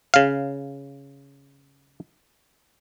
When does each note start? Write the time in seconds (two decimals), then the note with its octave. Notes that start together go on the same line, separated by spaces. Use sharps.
0.14 C#3 F5